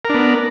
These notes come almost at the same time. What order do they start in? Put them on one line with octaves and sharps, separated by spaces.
A#4 D4 B3